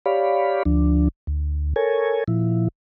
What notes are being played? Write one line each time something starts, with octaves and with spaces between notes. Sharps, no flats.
G4 C#5 D5 F5 B5
D2 F3 D4
D2
A4 A#4 C#5 G#5
A#2 F3 E4